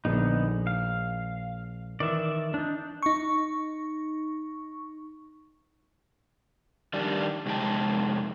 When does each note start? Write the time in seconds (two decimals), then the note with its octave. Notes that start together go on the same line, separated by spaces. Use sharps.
0.05 A#1 D3 B3 D#4
0.67 F5
2.00 D#3 E3 D5 E5
2.54 D4 D#4
3.03 D#4 C#6
6.94 D#3 G3 D4
7.46 F2 C3 G#3 D#4 G5 A5